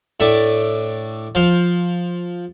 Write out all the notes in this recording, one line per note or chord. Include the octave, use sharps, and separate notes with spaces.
A2 D4 E5 A5 D6
F3 C5 F5